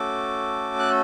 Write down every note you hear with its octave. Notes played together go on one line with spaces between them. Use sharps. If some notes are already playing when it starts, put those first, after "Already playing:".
Already playing: A3 C#4 F#4 A4 D6
F#6